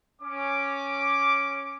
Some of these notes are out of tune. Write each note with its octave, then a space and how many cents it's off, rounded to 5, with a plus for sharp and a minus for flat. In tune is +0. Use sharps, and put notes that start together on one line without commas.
C#4 +0 D6 +0